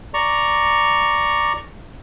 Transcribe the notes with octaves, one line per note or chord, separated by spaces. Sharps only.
D5 A#5 C#6